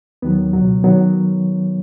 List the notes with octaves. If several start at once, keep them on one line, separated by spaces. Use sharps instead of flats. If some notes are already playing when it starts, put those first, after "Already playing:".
D#2 D#3 F#3 B3
C#2 B2 F#3
D#3 F#3 B3